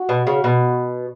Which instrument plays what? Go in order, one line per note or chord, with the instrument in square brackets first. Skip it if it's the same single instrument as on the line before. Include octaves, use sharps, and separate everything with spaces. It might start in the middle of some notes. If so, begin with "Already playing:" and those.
Already playing: [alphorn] F#4
[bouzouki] B2
C#3
B2